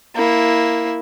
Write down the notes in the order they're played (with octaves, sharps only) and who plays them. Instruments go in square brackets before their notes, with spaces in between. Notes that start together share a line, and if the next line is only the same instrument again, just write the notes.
[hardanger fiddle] A#3 E4